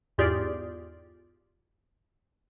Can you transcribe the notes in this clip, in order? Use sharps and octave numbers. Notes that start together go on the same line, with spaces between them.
E2 G#2 F4 G4 G#4 D5